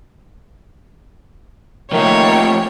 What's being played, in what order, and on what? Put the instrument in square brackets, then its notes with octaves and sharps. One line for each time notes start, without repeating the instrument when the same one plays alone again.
[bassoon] D#3 [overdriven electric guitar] F3 A3 [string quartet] A#3 G5 [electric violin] C#5